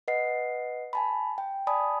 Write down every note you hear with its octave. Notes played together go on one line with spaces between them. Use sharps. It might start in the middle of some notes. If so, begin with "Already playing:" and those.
B4 D#5 F#5 C7
G#5 A5 B5
G5
D5 G#5 A5 B5 D#6